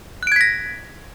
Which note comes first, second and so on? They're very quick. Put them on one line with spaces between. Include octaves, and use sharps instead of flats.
F#6 D7 G#6 B6 A#6